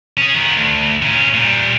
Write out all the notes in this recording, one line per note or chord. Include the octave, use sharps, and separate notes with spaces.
C#4 G#4
D#3 B3
D2
A#2 C#4
A#2 G3